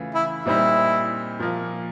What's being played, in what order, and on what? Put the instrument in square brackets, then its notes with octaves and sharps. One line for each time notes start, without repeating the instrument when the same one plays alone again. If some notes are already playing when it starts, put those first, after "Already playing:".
Already playing: [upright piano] C#3 E3 A3 F4
[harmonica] E4
[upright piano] A#2 G3 C4 D#4 [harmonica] E4
[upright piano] A#2 F3 A#3